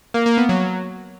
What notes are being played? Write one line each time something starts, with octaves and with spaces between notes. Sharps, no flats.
A#3
A#3
B3
F#3